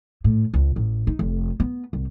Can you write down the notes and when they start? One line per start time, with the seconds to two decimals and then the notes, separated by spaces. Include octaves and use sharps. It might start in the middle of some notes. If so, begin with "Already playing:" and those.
0.24 A2
0.54 C#2
0.76 A1
1.07 D#4
1.19 F1
1.60 B3
1.93 C2